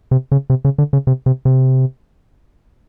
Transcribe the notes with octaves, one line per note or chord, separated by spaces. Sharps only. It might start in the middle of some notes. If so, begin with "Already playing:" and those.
C3
C#3
C3
C#3
D3
C#3
C3
C3
C3